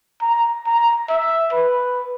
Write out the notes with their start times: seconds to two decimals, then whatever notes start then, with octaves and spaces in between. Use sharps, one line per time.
0.22 A#5
0.67 A#5
1.09 E5
1.52 B4